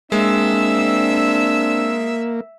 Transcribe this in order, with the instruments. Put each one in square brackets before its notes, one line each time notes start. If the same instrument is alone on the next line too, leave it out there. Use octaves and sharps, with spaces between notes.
[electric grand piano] G#3 [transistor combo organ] A#3 [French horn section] C4 D4 [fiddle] E5 E6